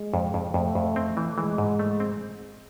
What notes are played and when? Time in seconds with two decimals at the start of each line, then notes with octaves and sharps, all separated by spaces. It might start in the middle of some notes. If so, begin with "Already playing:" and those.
Already playing: G#3
0.14 F2
0.34 F2
0.54 F2 A3
0.75 F2
0.96 C4
1.17 E3
1.37 E3 G#3
1.58 G#2
1.79 A3
2.00 C4